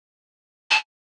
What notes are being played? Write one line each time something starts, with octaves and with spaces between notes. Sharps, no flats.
A5